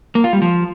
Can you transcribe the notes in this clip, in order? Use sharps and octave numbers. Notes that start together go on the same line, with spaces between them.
A#3
F4
G3
F3